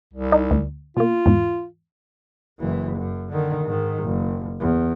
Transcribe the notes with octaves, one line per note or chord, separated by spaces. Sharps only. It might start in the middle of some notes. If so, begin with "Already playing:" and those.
C2
D#4
D2
B2 A#3 F4
E2 G#2
F#1 E3
F#2
D3 D#3
G#2 D#3
F#1
E2